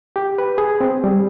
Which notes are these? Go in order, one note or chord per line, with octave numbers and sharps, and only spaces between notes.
G4
B4
G#4
C4
G3